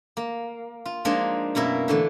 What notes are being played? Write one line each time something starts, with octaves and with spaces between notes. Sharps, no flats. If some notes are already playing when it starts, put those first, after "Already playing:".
A#3
F4
F3 G#3 A#3 D4 D#4
F#2 B2 A#3 E4
D3 E3 A3